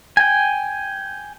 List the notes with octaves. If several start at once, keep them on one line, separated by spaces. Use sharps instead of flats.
G5 G#5